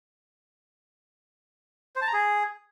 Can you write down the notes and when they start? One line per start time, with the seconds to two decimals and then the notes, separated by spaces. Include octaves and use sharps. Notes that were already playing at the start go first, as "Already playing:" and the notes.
1.96 C5
2.02 A5
2.07 A#5
2.13 G#4